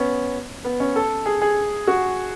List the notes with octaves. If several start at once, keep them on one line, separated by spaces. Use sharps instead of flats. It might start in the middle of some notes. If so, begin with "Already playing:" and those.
Already playing: B3 C#4
B3
C#4
A4
G#4
G#4
F#4